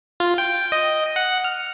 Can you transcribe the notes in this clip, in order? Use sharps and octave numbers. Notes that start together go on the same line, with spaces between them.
F4
G5
D#5
F#5
F6